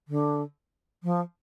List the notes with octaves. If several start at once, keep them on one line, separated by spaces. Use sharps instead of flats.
D3
F3